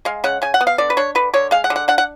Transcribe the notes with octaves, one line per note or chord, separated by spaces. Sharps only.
G#3 F5
C#3 F#5
C#3 G#5
F#5
B3
F5
D3 D5
B4
D4 C#5
D3 B4
D3 C#5
G#3 F5
F#5
D3
F#5
D4 F#5
F#5